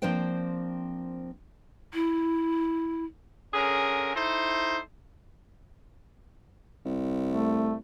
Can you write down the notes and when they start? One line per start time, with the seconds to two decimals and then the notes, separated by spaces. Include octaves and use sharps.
0.02 F3 A#3 C4 D4 C5 G5
1.94 E4
3.53 D3 C#4 G#4 A#4
4.15 D#4 E4 A4 C5
6.85 C2
7.30 A3